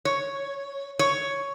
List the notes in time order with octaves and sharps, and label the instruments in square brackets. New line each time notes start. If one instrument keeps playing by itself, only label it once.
[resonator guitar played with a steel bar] C#5
C#5